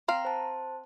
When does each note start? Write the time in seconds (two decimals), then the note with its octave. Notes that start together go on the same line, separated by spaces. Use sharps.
0.08 C4 F5 A#5
0.25 C5 A5